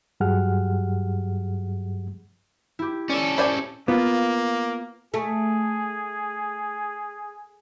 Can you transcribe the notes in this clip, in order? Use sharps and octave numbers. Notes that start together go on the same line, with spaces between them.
G2 F#3 G4 G#4 F#5 F6
E4 G4
C#4 A4 D5
E4 C5 D5 G#5
A#3 B3 F4
A3 G#4